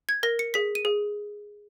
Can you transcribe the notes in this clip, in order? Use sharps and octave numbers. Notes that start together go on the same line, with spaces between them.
G#6
A#4 A#6
C#7
G#4 B6
D#7
G#4